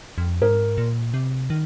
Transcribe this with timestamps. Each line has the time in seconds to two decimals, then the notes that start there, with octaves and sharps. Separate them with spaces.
0.18 F2
0.42 G#2 A#4
0.78 A#2
1.14 C3
1.50 D#3